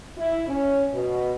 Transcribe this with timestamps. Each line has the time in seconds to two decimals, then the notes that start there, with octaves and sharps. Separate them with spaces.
0.18 E4
0.48 C#4
0.94 B2